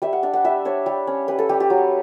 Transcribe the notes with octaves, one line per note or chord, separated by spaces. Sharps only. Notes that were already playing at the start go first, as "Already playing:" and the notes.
G3 E5
F#5
D4 E5
F#5
G3 E5
D4 C#5
G3
C#4
G3 B4
A4
G3 G4
G4
F#3